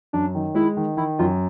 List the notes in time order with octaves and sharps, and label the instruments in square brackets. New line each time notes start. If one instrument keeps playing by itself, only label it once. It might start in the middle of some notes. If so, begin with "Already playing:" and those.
[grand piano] F#2 [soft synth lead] D4
[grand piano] D#3
[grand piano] G#3 [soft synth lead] E4
[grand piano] D#3
[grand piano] D#3 [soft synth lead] E4
[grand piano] F#2 [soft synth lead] F4